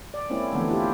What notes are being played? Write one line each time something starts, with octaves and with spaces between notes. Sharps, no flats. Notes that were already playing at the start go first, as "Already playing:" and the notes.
D5
G#3 A#3 C4 C#4 E4
D3 E3 F3 A3 B3 D4
E4 F4 G4